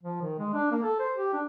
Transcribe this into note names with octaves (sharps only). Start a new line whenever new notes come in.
F3
D#3
G#3
D4
A#3
A4
C5
G4
D4